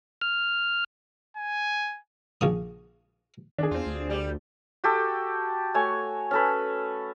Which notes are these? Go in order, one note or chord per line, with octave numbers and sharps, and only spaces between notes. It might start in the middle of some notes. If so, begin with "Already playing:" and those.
F6
G#5
A#1 C#3 D#6
D#3 D4 G#4
E2 C4 F4
D2
G3 G4
F#4 G4 A4
A3 F#4 C#5 G#5
C#4 A4 B4